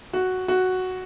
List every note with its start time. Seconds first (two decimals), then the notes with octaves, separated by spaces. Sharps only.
0.13 F#4
0.48 F#4